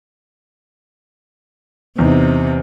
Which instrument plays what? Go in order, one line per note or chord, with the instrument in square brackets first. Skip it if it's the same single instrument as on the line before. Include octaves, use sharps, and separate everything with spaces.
[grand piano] E2 D#4 [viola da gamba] C3